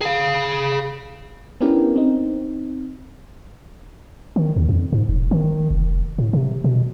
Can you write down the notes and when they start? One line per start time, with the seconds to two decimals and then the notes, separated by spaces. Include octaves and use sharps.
0.01 G#4 F5
1.61 B3 C#4 D4 E4 G4 A#4
1.96 C4 D#4
4.36 D#3
4.56 D#2
4.69 F2
4.93 G#2
5.09 E1
5.31 D#3
5.71 F1
6.18 A2
6.33 C3
6.64 B2